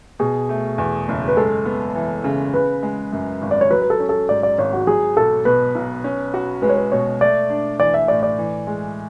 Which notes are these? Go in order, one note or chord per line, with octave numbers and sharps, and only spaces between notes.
B2 G#4
A3
E2
F#1
B4
G#3 A4
B3
E3
C#3
C#3 B4
G#3
F#2
G#1
D5
C#5
F#3 B4
B4
A4
C#4
A4
G#2 D5
D5
G#1 C#5
F#4
F#3 G#4
B1 A4
B2 B4
B1
C#4
F#4
G#3 B4
C#5
B4
B2 C#5
A3 D5
D4
E3 D5
E5
A2 D5
D5
E3
G#3